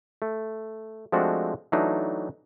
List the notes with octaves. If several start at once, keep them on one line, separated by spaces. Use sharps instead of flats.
A3
F3 G#3 A3 C4 D4 F#4
E3 F#3 A3 D4 D#4